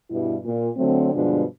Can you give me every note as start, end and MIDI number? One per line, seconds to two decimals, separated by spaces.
0.11 0.36 43
0.11 0.36 47
0.11 0.36 55
0.11 0.36 64
0.45 0.69 46
0.77 1.11 50
0.77 1.11 54
0.77 1.11 57
0.77 1.11 60
1.14 1.43 43
1.14 1.43 47
1.14 1.43 50
1.14 1.43 53
1.14 1.43 56
1.14 1.43 62